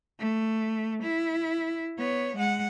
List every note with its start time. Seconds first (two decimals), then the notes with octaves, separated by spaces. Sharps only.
0.19 A3
1.02 E4
1.98 B3 C#5
2.36 G#3 F#5